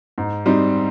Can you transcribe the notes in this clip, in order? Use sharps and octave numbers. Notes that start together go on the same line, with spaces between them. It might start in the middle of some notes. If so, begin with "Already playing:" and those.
G#2
G3 C4 D#4